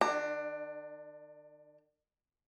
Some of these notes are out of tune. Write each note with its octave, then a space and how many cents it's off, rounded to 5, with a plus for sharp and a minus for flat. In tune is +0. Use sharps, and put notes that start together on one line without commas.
D#3 -45 D4 +20 A#5 -20